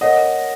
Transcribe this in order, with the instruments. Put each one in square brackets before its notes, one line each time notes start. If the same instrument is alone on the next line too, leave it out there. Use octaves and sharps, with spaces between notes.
[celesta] A#4 C#5 F#5 [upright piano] D#5